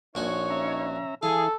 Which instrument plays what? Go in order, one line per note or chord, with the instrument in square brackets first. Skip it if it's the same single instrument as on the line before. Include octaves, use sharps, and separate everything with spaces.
[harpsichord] A#1 F#4 G#5 [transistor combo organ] A#3 [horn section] D#4 C#5
[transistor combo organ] C#4 E5 A#5
[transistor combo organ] E3 E4 [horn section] G#4 [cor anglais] A4 [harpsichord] F5